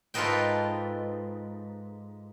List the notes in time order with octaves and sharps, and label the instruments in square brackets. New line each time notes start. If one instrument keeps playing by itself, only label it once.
[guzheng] G#2 F4 A4 B4 D#5 G5